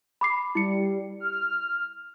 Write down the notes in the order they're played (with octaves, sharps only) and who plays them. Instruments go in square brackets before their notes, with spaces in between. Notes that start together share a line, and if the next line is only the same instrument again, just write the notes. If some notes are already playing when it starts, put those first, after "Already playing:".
[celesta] B5 D6 C7
[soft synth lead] G3 [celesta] E4 C#7
[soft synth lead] F6